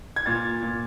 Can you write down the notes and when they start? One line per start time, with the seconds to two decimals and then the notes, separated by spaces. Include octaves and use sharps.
0.16 G#6
0.26 A#2 A6
0.63 A#2